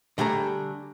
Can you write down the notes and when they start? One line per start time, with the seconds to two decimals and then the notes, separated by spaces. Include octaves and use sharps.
0.18 D3 G3 A3 G#4 A#5